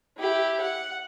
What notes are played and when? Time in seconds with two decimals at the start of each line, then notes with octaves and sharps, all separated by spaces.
0.18 E4 G4
0.61 F#5